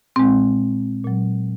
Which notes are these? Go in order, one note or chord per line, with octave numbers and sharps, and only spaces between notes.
A#2 G#3 C4
A#2 F#3